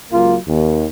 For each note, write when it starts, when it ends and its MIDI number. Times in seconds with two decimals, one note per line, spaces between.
0.12 0.36 37
0.12 0.36 54
0.12 0.36 58
0.12 0.36 65
0.47 0.85 39